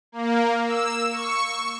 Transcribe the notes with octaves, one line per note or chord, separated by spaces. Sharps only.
A#3
E6
C#6